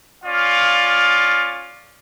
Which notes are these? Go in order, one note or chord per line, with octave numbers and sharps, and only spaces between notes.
C#4 F4 D5 F5